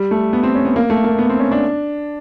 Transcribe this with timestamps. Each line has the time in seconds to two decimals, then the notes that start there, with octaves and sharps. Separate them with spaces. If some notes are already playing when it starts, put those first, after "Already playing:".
Already playing: G3
0.11 A3
0.33 B3
0.43 C4
0.55 C#4
0.65 B3
0.76 A#3
0.90 A3
1.04 A#3
1.19 B3
1.29 C4
1.40 C#4
1.52 D4